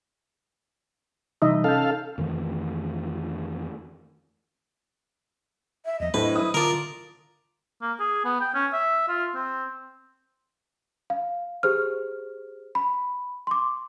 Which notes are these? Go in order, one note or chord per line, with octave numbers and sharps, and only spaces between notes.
C3 E3 G3 D#4 D#5 E5
C#4 A4 F5 G6
F2 D#3 E3 A3
E5
E2 F3 D#5
A2 F#3 D4 B4 C5
E4 D#6
D3 D4 F4 A#4
A#3
G#4
B3
G5
C#4
E5
F4
C4
F5
G4 G#4 C5 F6
B5
C6 D6